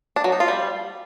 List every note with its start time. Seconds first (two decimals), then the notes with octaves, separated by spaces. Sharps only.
0.16 D4
0.24 F#3
0.32 D#4
0.40 F4
0.48 G3